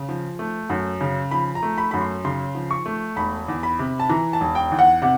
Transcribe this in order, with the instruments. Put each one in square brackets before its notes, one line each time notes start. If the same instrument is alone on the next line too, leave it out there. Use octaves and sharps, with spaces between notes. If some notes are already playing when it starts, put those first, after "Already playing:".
Already playing: [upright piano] C#3
F3
A3
F#2
C#3
F3 B5
A#5
A3
B5
F#2 B5
C6
C#3 C6
F3
C#6
A3
E1 B5
E2
B5
C3
A5
E3 A#5
A5
E1
G5
E2
F#5
C3 F#5